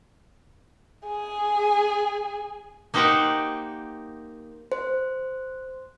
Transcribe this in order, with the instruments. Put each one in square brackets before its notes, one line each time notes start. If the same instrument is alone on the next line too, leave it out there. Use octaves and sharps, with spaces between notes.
[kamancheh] G#4 G#5
[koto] A#3 D#4 G4 C5 F#5 G5
[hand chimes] C5